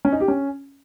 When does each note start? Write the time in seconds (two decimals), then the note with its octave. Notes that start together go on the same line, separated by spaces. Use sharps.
0.05 C#4
0.12 D#4
0.20 G4
0.28 C#4